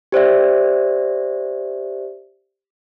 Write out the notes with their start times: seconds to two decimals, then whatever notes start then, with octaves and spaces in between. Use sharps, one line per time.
0.12 G4 C5 D5 E5